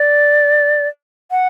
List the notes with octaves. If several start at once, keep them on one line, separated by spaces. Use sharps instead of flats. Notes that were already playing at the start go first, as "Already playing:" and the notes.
Already playing: D5
F#5